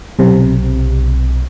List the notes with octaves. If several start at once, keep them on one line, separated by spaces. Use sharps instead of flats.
B1 C3